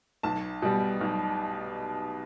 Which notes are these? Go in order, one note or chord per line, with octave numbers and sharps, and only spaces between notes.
B1 A5
B2 G3
B1